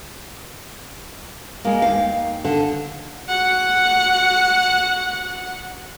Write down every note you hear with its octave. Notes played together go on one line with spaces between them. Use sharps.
G#3 A#3
D#2 F5
D3
F#4 F#5